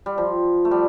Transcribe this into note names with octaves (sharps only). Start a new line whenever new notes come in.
G3
F3
A3
G3